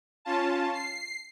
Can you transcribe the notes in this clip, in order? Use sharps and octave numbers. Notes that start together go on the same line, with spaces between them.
C#4 F4 A5
C7